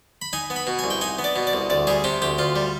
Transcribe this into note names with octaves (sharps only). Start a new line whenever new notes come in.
B5
D#4 G#5
B3
B5
B2
G#5
C2
G5
D#4 G#5
B3
D5
B2
D5
C2
D2 D5
G3 G#4
C3 G4
D2 G4
D2 F4
G3